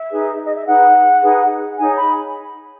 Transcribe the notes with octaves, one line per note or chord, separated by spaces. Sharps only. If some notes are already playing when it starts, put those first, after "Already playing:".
Already playing: E5
D#4 G#4 B4
D#5
E5
D#4 G#4 B4 F#5
D#4 G#4 B4
D#4 G#4 C#5 G#5
B5